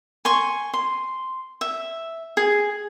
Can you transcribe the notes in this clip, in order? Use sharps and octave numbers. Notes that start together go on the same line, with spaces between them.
G#5 C6 C#6
C6
E5
G#4